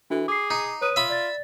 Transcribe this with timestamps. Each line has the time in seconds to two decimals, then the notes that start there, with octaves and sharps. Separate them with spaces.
0.10 E3 D4 F#4 A4
0.28 G#4 D6 C7
0.51 D#4
0.81 B4 C#5 D#6 D#7
0.96 F4 E5 B5
1.10 D5 A6